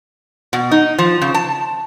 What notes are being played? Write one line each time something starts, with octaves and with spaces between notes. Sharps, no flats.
B2
D#4
F3
C#3
A5